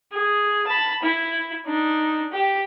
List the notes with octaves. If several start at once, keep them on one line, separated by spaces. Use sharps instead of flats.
G#4
A5 B5
E4
D4 D#4
G4